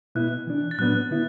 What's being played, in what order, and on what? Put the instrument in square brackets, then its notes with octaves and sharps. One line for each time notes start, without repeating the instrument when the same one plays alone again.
[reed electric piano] B2 B3 E4 [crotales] F#6
[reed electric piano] E3 D4
[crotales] A6
[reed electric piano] A2 F#3 B3 D4 [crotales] F#6
[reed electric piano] D3 B3 E4